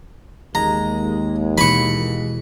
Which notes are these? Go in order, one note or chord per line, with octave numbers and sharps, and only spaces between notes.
D#2 G#3 A#5
B2 E3 B5 C#6